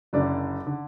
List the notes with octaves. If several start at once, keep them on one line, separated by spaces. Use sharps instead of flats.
F#1 F#2 D3 D5
D3